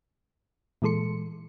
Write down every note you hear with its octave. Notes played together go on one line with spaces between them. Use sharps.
A#2 E3 G#3 A4 C6 C#7